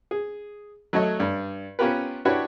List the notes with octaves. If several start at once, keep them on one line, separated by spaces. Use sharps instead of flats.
G#4
F#3 A3 A4 C#5 D#5
G2 D5
B3 C#4 F4 G4 A#4 B4
D4 E4 F#4 G4 B4 C#5